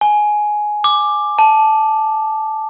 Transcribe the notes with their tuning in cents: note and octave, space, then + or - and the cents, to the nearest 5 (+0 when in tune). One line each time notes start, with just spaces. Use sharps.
G#5 +10
D6 +10
A5 -10